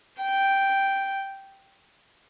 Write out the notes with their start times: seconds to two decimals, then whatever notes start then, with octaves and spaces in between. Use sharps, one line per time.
0.21 G5